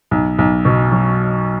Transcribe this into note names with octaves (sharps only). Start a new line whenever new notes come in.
B1
B1
B2
F#3